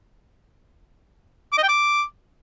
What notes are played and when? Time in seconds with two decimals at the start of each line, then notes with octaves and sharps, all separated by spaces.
1.52 D6
1.58 D#5
1.63 G5
1.68 D6